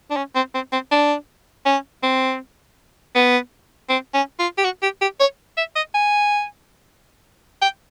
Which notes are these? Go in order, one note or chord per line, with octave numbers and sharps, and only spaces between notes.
D4
C#4
C4
C4
C4
D4
C#4
C4
B3
C4
C#4
F4
G4
F#4
G4
G4
C#5
E5
D#5
G#5
G5